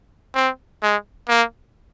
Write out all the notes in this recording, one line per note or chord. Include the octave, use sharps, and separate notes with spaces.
C4
G#3
A#3